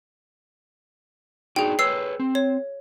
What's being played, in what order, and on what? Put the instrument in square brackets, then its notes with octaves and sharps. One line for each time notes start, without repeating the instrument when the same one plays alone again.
[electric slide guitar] D4 D#4 F#4 [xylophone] G#4 G5
[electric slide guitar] G#4 B4 C#5 [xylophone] E6 C7
[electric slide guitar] C4
[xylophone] C#5